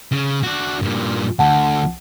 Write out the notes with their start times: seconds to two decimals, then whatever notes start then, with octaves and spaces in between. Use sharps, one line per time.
0.12 C#3
0.43 D4 F#4
0.82 G2 A#2
1.39 D2 F#5 A5